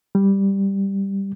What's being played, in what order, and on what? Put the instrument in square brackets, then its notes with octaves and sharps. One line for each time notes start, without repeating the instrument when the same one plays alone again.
[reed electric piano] G3